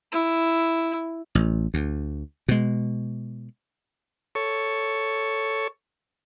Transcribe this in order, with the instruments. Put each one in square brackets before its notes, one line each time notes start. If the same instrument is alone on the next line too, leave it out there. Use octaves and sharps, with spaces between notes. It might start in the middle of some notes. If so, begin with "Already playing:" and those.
[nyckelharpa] E4
[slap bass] A1
D2
B2 G#3
[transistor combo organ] A4 C#5 C#6